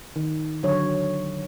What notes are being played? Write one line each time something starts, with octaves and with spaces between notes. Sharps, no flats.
D#3
D3 F#3 C#5